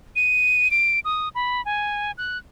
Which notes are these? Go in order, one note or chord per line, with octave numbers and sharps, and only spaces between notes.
D#7
D7
D#6
B5
G#5
F#6